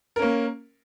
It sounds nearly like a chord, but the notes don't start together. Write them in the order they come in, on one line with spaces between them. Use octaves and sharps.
A#4 C#4 A#3